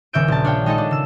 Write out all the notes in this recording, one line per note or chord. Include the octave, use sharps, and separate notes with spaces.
D#1 C#3 C#5 E5 G6 D7
A#1 A5
D4 C#5 F5 G5
G#3 D#4 A4 D#5
D4
C#3 E6